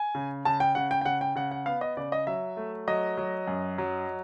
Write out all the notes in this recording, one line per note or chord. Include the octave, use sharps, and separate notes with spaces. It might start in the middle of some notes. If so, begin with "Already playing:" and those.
Already playing: G#5
C#3
C#3 A5
G5
C#3 F#5
G5
G5
C#3 F#5
G5
C#3 F#5
F#5
B3 F5
D#5
C#3 D5
D#5
F#3 E5
A3
F#3 D#5
F#3
F#2
F#3